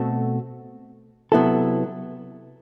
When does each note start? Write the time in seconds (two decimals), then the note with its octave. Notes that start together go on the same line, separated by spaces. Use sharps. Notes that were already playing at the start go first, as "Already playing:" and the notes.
Already playing: B2 A3 C4 F#4 A4
1.32 C3 F#3 B3 E4 A4